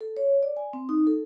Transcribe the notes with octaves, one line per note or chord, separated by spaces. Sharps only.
A4
C#5
D5
G#5
C4
D#4
A4